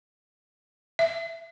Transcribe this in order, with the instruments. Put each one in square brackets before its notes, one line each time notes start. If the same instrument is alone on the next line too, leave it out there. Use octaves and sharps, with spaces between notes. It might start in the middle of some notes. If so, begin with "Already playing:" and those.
[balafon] E5